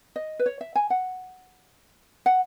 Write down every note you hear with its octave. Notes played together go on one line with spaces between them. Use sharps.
D#5
B4
C#5
E5
G#5
F#5
F#5